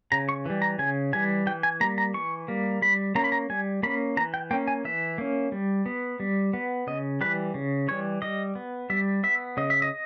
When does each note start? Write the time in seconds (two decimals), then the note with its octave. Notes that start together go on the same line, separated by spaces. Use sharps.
0.12 C#3 A#5
0.29 C#6
0.46 E3 G3
0.62 A#5
0.79 C#3 G#5
1.13 E3 G3 G#5
1.47 E3 G5
1.63 G#5
1.80 G3 A#3 A#5
1.98 A#5
2.14 E3 C#6
2.48 G3 A#3
2.82 G3 B5
3.15 A#3 C#4 A#5
3.24 B5
3.32 A#5
3.50 G3 G#5
3.83 A#3 C#4 B5
4.17 E3 A#5
4.34 G5
4.51 A#3 C#4 G5
4.67 G#5
4.85 E3 E5
5.18 A#3 C#4
5.52 G3
5.86 B3
6.20 G3
6.53 B3
6.87 C#3 D#5
7.21 E3 G3 B4
7.54 C#3
7.88 E3 G3 C#5
8.22 G3 D#5
8.55 B3
8.90 G3 E5
9.23 B3 E5
9.57 C#3 D#5
9.70 E5
9.82 D#5